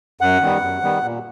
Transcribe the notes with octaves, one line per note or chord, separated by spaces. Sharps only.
F#2 F#5
D#3 G3 B3
F#2
D#3 G3 B3
A#2